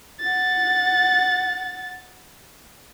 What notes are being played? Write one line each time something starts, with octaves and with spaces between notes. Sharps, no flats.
F#5 A6